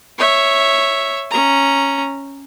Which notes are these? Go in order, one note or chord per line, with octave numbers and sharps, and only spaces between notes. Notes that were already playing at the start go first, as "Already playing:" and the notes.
C#5 E5
C#4 A#5